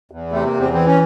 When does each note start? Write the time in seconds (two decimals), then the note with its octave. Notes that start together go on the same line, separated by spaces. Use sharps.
0.11 E2
0.32 C3 A3
0.46 A#3
0.54 E2
0.60 C4
0.73 E3 C4
0.87 C#4